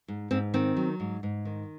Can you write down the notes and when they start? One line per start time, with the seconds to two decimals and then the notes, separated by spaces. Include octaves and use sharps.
0.08 G#2
0.31 G#2 C4
0.54 D#3 C4
0.77 F#3
1.00 G#2
1.23 G#2
1.45 D#3